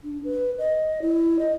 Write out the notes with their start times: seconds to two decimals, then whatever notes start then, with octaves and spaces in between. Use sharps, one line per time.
0.04 D4
0.24 B4
0.58 D#5
1.01 E4
1.39 D#5